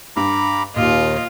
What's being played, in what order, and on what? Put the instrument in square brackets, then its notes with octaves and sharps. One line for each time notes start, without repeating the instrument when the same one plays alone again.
[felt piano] G2 [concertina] A#5 B5 D6
[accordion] D#2 [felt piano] A#2 [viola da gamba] F4 [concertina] D#5